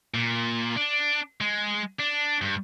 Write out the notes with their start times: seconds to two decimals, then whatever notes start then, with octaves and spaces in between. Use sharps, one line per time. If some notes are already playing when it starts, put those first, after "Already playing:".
0.14 A#2
0.76 D4
1.41 G#3
1.99 D4
2.42 G2